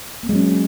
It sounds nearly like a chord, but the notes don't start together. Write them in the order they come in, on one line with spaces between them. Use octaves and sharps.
A#3 C4 G#3 F#3 C#4